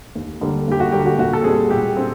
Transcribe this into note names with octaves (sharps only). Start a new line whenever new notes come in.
D#2
D3 G3 A#3
D#2 G4
F#4
D3 G3 A#3 G4
F#4
A#2 F#4
A4
G3 C4 G#4
A#2 G4
C4